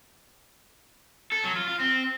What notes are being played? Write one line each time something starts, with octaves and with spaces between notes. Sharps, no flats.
A4
F#3
F4
F4
C4